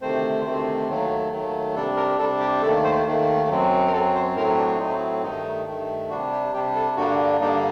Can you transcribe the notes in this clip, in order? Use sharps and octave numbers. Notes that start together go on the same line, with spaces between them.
D2 C3 D#3 A3 C4 C5
D2 C3 D#3 A3 C4
D#2 D#3 F#3 A3
D#2 D#3 F#3 A3
C3 G3 D4 A4
A#4
C3 G3 D4 A4
G4
D#2 D#3 A3 A4
C5
D#2 D#3 A3
F#2 F#3 C4
A#4
F#2 F#3 C4 A4
C5
A2 F#3 A3 C4 A#4
D4
A2 F#3 A3 C4 D#4
G2 D#3 A3 D#4
G2 D#3 A3
C3 G3 D4 F#4
G4
C3 G3 D4 G4
A4
G2 D3 G3 A#3 D4 F#4
G2 D3 G3 A#3 D4 D#4